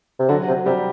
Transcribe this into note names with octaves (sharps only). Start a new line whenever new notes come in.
C3
D3 F#3 F#4
C3
C3 G3 G4